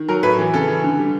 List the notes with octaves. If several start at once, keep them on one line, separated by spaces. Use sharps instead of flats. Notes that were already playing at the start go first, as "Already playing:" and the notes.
Already playing: D#3
F#3 A#4
A2 B4
E3
C#3 A4
E3
D3
G3